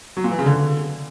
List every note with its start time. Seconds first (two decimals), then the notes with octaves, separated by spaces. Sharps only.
0.17 F#3
0.24 A#2
0.31 E3
0.39 C#3
0.46 D3